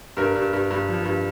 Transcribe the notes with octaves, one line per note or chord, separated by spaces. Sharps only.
G2 A#4
G2
G2
G2
F3
G2